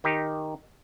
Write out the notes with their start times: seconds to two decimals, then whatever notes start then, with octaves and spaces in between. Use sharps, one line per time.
0.04 D#3 D#4 G4